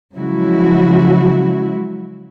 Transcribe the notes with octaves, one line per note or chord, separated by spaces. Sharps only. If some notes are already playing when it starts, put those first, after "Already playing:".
C#3 F3 F#3 G#3 E4 F#4